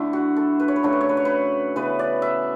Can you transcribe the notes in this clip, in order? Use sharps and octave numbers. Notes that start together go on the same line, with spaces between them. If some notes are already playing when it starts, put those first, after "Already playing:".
Already playing: D3 A3 D4 E4
F#4
A4
B4
C#5
B4
C#3 F#3 A3 D4 C#5
B4
C#5
B4
C#5
B4
C#3 E3 B3 B4
D5
E5